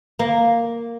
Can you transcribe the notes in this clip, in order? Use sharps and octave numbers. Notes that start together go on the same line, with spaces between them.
A#3